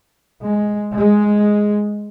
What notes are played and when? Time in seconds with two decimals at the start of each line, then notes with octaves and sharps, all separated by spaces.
0.41 G#3
0.95 G#3